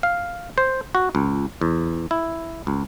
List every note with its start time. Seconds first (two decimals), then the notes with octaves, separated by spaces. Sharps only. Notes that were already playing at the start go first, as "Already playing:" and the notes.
0.03 F5
0.58 C5
0.95 F#4
1.15 C#2
1.61 E2
2.11 E4
2.67 C#2